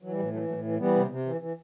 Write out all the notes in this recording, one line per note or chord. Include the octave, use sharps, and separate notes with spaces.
E3 F#3
G3
A2 F#3
E3 F#3 A3
A2 F#3 A3
E3
E3 G3 B3
C3
C3
E3
E3